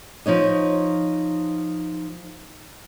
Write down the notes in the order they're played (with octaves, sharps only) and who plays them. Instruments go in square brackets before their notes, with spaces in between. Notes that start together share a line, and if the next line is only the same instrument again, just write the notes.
[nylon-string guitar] F3 D#4 C#5 D#5